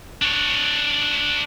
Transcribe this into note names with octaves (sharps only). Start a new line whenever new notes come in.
D4 C#5